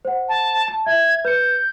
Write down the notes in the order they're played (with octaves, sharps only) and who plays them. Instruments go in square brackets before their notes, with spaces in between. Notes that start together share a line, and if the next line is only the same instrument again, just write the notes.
[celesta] C5 F#5
[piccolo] A5
[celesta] A5
[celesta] E5 [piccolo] G#6
[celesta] B4 C#7 [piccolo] G6